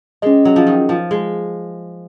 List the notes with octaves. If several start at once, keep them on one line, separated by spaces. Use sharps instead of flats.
G#3 C#4 G#4 D#5
F#3
F3
D#3
F3
G#3